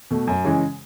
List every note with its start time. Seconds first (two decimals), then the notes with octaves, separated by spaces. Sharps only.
0.11 B2 A3
0.27 F#2
0.45 C#3 E3 G#3